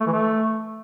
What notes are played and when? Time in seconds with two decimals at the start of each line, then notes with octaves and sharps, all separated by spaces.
0.01 A3
0.07 E3
0.12 A3